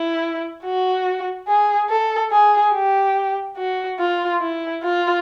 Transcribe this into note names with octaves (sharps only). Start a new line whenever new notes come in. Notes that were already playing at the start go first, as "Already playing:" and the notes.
Already playing: E4
F#4
G#4
A4
G#4
G4
F#4
F4
E4
F4